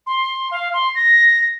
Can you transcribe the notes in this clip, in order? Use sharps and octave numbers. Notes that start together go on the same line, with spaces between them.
C6
F5
C6
A#6